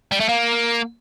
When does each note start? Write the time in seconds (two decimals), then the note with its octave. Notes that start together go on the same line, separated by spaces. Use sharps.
0.12 G3
0.20 A3
0.29 A#3